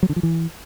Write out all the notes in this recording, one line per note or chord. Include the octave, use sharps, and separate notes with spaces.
F#3
D3
F3
E3